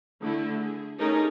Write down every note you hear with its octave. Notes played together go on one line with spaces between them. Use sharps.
D3 A3 E4
G#4
A3 C#4 D#4 G4 G#4 A#4